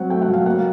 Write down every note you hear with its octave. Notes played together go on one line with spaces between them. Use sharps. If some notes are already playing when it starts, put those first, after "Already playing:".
Already playing: F#3 C4 F#5
A3 G5
F#5
F#3
F5
A#3 F#5